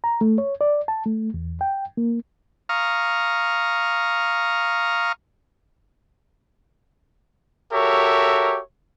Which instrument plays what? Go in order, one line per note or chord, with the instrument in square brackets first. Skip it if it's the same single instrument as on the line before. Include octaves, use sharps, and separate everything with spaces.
[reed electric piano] A#5
A3
C#5
D5
A5
A3
E2
G5
A#3
[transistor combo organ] F5 A#5 C#6 D#6 F6
[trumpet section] F#4 G4 A4 A#4 C#5 E5